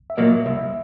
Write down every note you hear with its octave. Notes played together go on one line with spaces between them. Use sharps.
E5
A#2 F#3 A#3 D#5
C2 E5